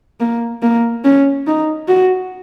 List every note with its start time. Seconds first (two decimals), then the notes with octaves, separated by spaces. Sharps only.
0.20 A#3
0.62 A#3
1.04 C#4
1.47 D#4
1.88 F#4